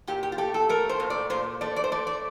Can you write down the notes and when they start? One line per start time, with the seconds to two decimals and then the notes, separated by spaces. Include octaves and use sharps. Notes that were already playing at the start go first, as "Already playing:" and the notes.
0.07 A#2 G4
0.23 G4
0.32 F4
0.38 A3 G4
0.54 A4
0.69 A3 A#4
0.89 C5
1.00 A#2
1.10 D5
1.30 A#2 C5
1.61 A3 D5
1.76 D5
1.84 C5
1.92 A3 D5
2.07 D5